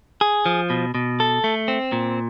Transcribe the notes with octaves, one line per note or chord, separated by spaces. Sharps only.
G#4
F3
B2
B2
A4
A3
C4
A#2